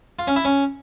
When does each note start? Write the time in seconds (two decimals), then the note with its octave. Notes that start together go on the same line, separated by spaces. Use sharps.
0.19 F4
0.27 C#4
0.36 E4
0.45 C#4